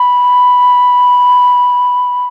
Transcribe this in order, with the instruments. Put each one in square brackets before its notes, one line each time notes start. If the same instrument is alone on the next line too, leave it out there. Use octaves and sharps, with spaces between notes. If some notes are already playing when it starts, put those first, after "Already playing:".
Already playing: [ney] B5